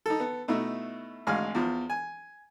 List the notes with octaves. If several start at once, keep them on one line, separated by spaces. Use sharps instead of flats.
D#4 A4
B3 A4
B2 A3 D#4 E4
G#1 D2 G#3 F5 G#5 F6
E2 F3
G#5